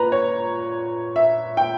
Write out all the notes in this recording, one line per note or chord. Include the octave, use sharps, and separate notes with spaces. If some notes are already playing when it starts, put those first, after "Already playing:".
Already playing: A#2 B4 A#5
C#5
E5
G5